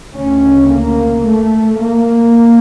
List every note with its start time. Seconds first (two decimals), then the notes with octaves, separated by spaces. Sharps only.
0.14 D2 C#3 C#4
0.70 A#3
1.25 A3
1.81 A#3